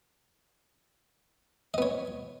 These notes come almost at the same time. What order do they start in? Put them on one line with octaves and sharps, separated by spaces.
D#5 B3 C#5